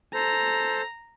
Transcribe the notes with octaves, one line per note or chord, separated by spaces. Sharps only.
A4 C5 A#5